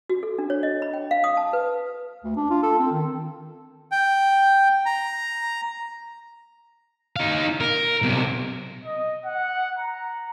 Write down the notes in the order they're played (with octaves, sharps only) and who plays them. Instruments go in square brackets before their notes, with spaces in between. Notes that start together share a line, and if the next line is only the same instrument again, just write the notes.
[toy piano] F#4
A4
D4
C#5
D#5
B5
G5
F5
D#6
A5
B4
[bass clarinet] D2
D4
F4
A4
C4
D#3
[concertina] G5
A#5
[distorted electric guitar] D#4 F5
A#4
B1 C3
[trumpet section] D#5
F#5
A#5